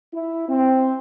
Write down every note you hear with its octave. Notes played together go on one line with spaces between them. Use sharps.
E4
C4